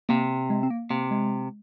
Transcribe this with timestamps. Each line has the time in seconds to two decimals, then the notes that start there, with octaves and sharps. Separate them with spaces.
0.09 C3 A#3
0.50 G#3
0.63 C4
0.70 A#3
0.90 C3 A#3
1.11 G#3